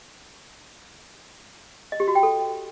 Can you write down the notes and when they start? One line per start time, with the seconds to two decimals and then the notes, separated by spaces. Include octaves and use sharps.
1.92 D#5
2.00 G4
2.08 F#4
2.15 G5
2.23 A4